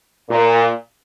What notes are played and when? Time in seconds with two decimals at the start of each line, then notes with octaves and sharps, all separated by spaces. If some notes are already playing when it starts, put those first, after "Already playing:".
0.30 A#2